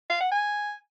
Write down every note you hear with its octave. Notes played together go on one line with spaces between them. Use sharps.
F5
F#5
G#5